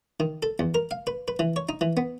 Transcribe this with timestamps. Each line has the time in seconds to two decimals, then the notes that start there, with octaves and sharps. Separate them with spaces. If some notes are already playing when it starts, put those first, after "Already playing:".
0.20 D#3
0.43 A4
0.59 E2
0.75 A#4
0.91 F5
1.07 B4
1.28 B4
1.39 E3
1.56 C#5
1.69 D#4
1.81 E3
1.97 B3